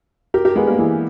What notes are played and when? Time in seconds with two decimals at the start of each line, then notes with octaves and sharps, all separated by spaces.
0.34 G4 A#4
0.45 G4 A#4
0.56 G#3 B3
0.67 G3 A#3
0.79 E3 G#3